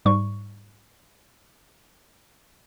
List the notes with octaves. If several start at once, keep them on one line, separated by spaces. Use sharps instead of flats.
G#2 G3 C#6